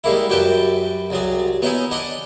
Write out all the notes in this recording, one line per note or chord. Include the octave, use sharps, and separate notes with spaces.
G3 G#3 A#3 E4
F#2 F#4 G4 B4 G5 A5
C2 F#3 G#4
B3 C#4 D#4 E4 G#4
D4 D#5 F#5